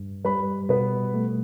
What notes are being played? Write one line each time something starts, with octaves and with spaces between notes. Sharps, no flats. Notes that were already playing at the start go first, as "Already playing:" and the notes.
Already playing: G2
G3 B4 B5
B2 B3 B4
A3